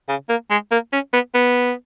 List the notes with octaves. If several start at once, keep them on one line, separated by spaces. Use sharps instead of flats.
C#3
A#3
G#3
A#3
C#4
B3
B3